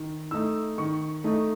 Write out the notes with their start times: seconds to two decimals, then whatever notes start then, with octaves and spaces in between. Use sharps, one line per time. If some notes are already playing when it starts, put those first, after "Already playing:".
Already playing: D#3
0.31 A3 D#4 E6
0.78 D#3 C#6
1.24 A3 D#4